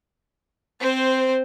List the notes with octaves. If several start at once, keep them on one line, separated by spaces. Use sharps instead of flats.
C4 C5